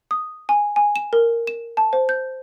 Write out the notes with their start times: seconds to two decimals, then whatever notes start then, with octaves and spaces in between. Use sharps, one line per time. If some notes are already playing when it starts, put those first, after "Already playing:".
0.11 D#6
0.49 G#5
0.76 G#5
0.96 E7
1.13 A#4
1.47 E7
1.77 A5
1.93 C5
2.09 G6